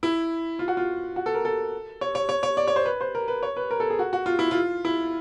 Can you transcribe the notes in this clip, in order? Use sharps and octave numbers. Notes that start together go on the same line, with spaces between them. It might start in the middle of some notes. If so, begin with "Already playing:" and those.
E4
F4
F#4
F4
F#4
A4
A#4
A4
C#5
C#5
C#5
C#5
D5
C#5
C5
B4
C5
A#4
B4
C#5
B4
A#4
A4
G#4
F#4
F#4
F4
E4
F4
E4